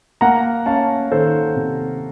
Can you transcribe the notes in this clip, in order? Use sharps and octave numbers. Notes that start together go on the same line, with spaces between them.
A#3 F#5 A#5
C#4 F5 A5
D#3 A4 C5
C3